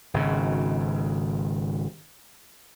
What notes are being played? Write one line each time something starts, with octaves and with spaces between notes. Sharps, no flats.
G#1 C#3